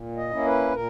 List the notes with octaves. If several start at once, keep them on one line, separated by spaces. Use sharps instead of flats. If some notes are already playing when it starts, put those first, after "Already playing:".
Already playing: A#2
D#5
A#3 C#4 E4
B4
A#2 A#4